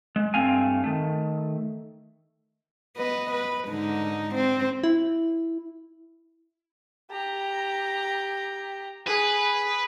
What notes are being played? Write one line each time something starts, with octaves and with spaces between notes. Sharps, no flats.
G#3
G2 A3 C4 F5 G#5
D#3 A3
B3 B4 D#5
B4
G#2 D3 D#4
C4
E4
G4 A#5
G#4 B4